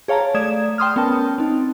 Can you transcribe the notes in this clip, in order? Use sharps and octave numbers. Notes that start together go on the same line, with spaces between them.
G#4 C#5 F5 A5 A#5
A3 D5 D#6 G#6 E7
G5 C6 D#6 F6
B3 C#4 A#4 G5 A5
C4 D#4